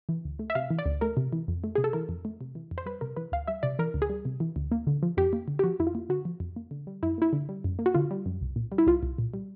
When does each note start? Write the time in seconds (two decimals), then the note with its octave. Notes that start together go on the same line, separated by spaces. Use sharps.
0.09 E3
0.25 D2
0.39 A3
0.50 E5
0.55 C3 F5
0.70 E3
0.78 D5
0.86 D2
1.01 A3 A#4
1.17 C3
1.33 E3
1.48 F2
1.64 A3
1.75 C3 G#4
1.84 A4
1.93 E3 A#4
2.09 F2
2.25 A3
2.41 C3
2.55 E3
2.71 F2
2.78 C5
2.86 G3 B4
3.01 C3 A#4
3.17 E3 B4
3.32 D2 F5
3.48 G3 E5
3.63 C3 D5
3.79 E3 A#4
3.94 D2
4.02 G#4
4.10 G3
4.25 C3
4.40 E3
4.56 D2
4.72 A#3
4.87 D3
5.03 F3
5.17 F2 G4
5.33 A#3
5.48 D3
5.59 G4
5.64 F3 F#4
5.80 F2 E4
5.87 F4
5.95 A#3
6.09 D3 F#4
6.25 F3
6.40 F2
6.56 A#3
6.71 D3
6.87 G3
7.03 F#2 E4
7.18 A#3 E4
7.33 D3
7.49 G3
7.64 F#2
7.79 A#3
7.86 F#4
7.94 D3 F4
8.11 G3
8.26 F#2
8.41 C2
8.56 A#2
8.72 G3
8.78 E4
8.87 C2 F4
9.03 C2
9.18 A#2
9.34 G3